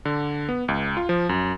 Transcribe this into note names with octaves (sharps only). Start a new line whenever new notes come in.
D3
B3
C#2
F4
F3
F#2